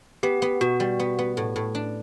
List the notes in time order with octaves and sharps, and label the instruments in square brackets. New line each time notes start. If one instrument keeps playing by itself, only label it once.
[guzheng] B3 [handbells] G4
[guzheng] B3
[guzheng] B2 [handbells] F#4
[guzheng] G3
B3
B3
A2
A2
D4